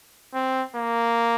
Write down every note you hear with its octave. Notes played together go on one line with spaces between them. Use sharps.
C4
A#3